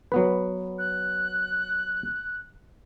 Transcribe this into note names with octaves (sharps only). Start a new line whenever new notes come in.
F#3 B3 B4
F#6